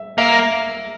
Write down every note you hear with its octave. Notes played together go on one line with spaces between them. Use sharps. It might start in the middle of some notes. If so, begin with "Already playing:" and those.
Already playing: E5
A#3 E5